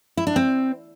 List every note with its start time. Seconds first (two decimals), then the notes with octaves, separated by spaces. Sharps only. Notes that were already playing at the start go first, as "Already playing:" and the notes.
0.17 E4
0.27 D4
0.36 C4